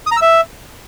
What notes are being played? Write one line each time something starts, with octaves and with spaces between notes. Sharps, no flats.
D#6
A#5
E6
E5